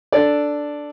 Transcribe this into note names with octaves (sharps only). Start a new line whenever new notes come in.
D4 A4 D5